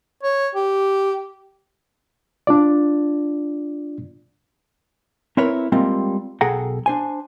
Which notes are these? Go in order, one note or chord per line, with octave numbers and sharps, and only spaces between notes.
C#5
G4
D4 F4 D5
C4 E4 A#4 B4 C#5
G3 G#3 A#3 C4 F4
B1 G#4 A4 F#5 G5 A#5
D4 C5 G#5